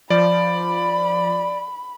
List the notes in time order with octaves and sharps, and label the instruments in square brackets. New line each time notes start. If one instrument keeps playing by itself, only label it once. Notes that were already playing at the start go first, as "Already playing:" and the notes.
[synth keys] F3 [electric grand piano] D5 [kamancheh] B5